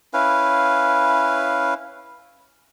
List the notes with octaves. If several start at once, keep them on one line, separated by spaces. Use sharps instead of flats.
C#4 E4 B4 F5